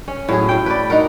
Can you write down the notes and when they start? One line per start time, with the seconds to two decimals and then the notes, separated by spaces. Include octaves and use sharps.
0.08 C#4
0.29 A2 F#3 G#4
0.49 A2 G5
0.66 B4 D5
0.90 D#4 F#4 A#4